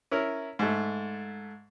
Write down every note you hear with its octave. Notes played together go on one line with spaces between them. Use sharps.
C#4 E4 A#4
G#2 A3